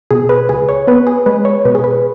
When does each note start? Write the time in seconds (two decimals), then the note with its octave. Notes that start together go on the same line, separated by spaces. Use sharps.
0.11 B2 G#4
0.29 B4
0.49 C#2 G#4
0.69 C#5
0.87 B3 B4
1.07 G#4
1.26 G#3 B4
1.45 C#5
1.65 B2 B4
1.75 G#4
1.84 B4